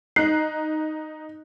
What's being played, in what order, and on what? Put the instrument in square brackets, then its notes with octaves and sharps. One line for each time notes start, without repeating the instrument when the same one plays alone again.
[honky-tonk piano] D#4 F#6 [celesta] C7